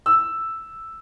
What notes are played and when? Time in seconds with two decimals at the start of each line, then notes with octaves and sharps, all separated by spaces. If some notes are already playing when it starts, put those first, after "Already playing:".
0.06 E6